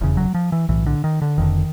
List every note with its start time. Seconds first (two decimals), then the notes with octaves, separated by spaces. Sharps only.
0.01 F1 E2 C#3
0.17 F#3
0.34 F3
0.52 E3
0.69 B1 A2 E3
0.86 D3
1.04 D#3
1.22 D3
1.38 F1 F2 D3 D#3